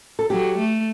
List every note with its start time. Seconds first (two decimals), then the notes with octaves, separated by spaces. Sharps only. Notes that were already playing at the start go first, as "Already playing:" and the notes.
0.19 A4
0.30 F#3 G4
0.58 A3